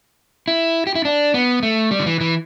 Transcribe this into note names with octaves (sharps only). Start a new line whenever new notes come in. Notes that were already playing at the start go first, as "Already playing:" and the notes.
E4
G4
E4
D4
B3
A3
G3
D3
E3
E3